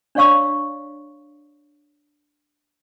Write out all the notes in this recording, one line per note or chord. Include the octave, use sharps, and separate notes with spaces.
D4 C#5 D5 F5 C#6 E6